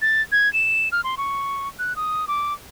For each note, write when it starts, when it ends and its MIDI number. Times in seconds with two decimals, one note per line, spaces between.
0.02 0.22 93
0.32 0.51 92
0.53 0.89 100
0.92 1.01 89
1.04 1.15 84
1.18 1.68 85
1.79 1.96 90
1.96 2.25 87
2.28 2.53 86